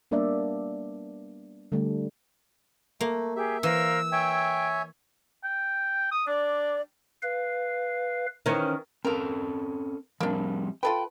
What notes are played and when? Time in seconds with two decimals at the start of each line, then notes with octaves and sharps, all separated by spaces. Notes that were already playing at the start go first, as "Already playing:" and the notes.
0.11 G3 A#3 B3 D4 D5 E5
1.72 D3 G3 A3
3.01 A3 A#3
3.36 G4 G#4 E5
3.63 E3 A#4 C5 F5 E6
4.12 C#5 E5 G5 G#5
5.44 G5
6.11 D#6
6.27 D4 D5
7.23 B4 F5
8.46 D#3 E3 C#4
9.05 A#3 C4 C#4 A4 A#4
10.20 F3 G3 A#3 C4 D4
10.83 F4 A4 B4 G5